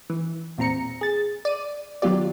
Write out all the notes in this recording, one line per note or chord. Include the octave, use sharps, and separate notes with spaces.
E3
E2 A#2 C4 A#5 C#7
G#4 A6
D5 D#7
D#3 F#3 B3 F4 G4 D5